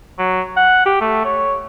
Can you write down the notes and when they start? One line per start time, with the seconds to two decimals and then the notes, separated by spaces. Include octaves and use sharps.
0.19 F#3
0.57 F#5
0.86 G4
1.01 A3
1.24 C#5